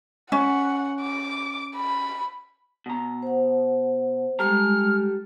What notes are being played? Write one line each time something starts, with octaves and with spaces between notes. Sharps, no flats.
C#4 F#5
D6
B5
B2 A#5
C5 F#5
G3 G#3 G4 A4 A#5 F6